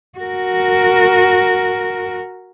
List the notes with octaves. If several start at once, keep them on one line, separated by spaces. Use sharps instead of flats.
F#4 A#4